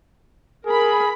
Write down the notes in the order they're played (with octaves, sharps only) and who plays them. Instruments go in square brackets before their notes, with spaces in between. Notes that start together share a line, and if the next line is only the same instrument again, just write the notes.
[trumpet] G#4 [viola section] A#4 B5